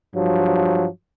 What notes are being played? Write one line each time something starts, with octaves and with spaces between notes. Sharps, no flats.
G2 F3 F#3